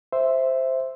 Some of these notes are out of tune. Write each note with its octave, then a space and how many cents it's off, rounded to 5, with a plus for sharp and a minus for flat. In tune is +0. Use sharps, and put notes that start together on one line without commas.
C5 +0 E5 +0